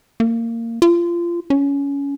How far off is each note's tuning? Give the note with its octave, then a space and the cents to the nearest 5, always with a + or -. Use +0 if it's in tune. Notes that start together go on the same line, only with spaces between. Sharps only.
A#3 -20
F4 -25
C#4 +20